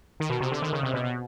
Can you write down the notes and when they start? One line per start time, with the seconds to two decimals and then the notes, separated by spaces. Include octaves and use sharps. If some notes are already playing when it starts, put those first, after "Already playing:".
0.20 D#3
0.30 B2
0.40 C3
0.51 D3
0.62 D#3
0.73 C#3
0.83 C3
0.94 B2
1.04 B2